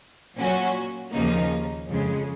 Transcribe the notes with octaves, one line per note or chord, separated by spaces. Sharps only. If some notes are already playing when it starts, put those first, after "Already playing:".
A#2 F#3 C#4 F#4
D#2 C#3 F3 A#3 D#4
F2 C#3 G#3